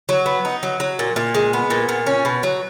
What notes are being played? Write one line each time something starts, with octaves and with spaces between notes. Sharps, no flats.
F#3
B3
D#4
F#3
F#3
A#2
A#2
G#3
B3
A#2
A#2
C#4
B2
F#3